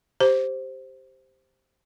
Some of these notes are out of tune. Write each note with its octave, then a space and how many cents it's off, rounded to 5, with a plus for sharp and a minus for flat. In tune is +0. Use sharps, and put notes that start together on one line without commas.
G4 +0 C5 +0